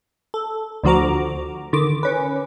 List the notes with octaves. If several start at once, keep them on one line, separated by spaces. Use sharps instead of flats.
A4
D2 D3 F3 F#4 A#5 D6
D3 D#3 D6
C#4 B4